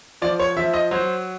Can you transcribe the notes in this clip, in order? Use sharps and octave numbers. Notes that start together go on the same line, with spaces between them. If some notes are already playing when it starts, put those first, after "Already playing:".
F3 D5
C#5
F3 E5
D#5
F#3 C5